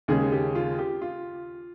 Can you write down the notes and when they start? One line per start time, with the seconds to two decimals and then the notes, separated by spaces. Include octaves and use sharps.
0.08 D#2 C#3 G#3 G#4
0.32 G4
0.55 F4
0.79 G4
1.01 F4